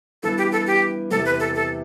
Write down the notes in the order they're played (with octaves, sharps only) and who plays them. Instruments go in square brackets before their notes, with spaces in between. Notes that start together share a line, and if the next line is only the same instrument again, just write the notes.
[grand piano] G2 E3 B3 [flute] A4
[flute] G4
A4
G4
[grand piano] E2 C3 E3 [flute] A4
[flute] B4
A4
A4